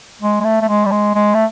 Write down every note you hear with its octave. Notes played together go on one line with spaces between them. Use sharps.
G#3
G#3
A3
A3
G#3
G3
G#3
G#3
A3